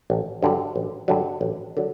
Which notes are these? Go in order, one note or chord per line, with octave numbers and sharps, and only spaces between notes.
A1
G2 D3 F#3
A1
G2 D3 F#3
A1
D3 F#3